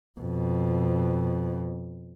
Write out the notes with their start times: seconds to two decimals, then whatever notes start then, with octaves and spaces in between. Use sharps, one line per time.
0.20 F2 B2